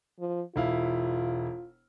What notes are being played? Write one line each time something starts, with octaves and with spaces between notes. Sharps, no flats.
F3
E1 E4 F4 F5